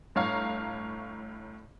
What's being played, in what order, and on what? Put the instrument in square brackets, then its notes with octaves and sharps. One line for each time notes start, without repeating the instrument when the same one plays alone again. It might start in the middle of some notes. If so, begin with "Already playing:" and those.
[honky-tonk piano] G1 A2 C#5 F5 A#5